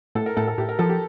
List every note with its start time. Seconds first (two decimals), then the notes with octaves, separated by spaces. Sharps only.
0.15 A2 A4
0.26 A#4
0.37 A2 A4
0.47 A4
0.58 A2 G4
0.69 A#4
0.79 F3 A4
0.89 G4